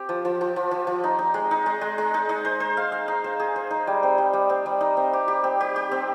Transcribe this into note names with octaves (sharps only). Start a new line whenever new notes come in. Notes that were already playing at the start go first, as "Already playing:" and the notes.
Already playing: C4 G4
F3
F3
F3
F3
F3
F3
D#4
D#4
G#3
D#4
G#3
G#3
G#3
D#4
D#4
C5
C5
F5
F5
D#4
C5
G#4
C5
D#4
G3
C4
G3
G3
C4
G3
D#4
C4
G4
G4
C4
G4
G4
C4